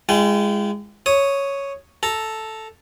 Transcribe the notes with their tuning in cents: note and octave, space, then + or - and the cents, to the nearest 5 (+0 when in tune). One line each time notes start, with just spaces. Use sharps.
G#3 -10 F4 -45 G5 -25
C#5 +0 D#6 +0
A4 +0 A#5 +0